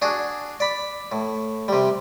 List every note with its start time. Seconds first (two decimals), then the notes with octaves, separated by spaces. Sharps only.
0.02 D4 F#4 G#4
0.60 D5 B5
1.12 A2
1.68 C3 G3